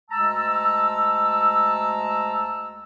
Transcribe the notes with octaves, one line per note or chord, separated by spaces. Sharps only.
D2 G#3 A5 A#5 E6